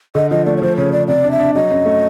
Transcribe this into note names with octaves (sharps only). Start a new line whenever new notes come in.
D3 D#5
F3 D#5
A3 D5
C#5
F3 C5
C#3 C#5
C#3 D5
C3 D5
D4
E5
D4
F#3 D#5
F#2
A3